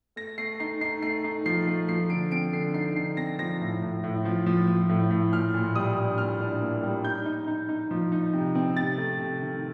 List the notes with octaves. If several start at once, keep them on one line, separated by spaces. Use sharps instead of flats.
A3 A#6
A3 C7
D#4 C7
D#4 C7
A3 C7
D#4
F3 C7
A3
F3 C7
D3 D7
C4 D7
D3 C7
D#4 C7
D3 C7
C4 A#6
F3 A#6
A2
A2
A2
F3
F3
F3
A2
A2
A#2 F6
A#2
G3 D#6
D4
A#2 F6
D4
A#3
G3
D#4 G6
D#4
D#4
D#4
F3
D#4
C3
C4
C3 A6
A3
C3
D#3